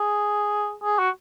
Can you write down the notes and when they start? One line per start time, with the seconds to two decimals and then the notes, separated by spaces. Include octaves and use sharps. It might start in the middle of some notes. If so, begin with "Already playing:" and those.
Already playing: G#4
0.83 G#4
0.99 F#4